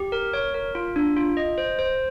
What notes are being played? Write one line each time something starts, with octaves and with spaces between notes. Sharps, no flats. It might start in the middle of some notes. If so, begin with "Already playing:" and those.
Already playing: G4
A#4
C#5
A#4
F4
D4
F4
D#5
C5
C5